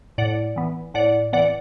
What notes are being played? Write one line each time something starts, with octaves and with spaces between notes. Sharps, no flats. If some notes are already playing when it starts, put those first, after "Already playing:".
A2 D5 F#5
E3 B3
A2 D5 F#5
E3 B3 D5 F#5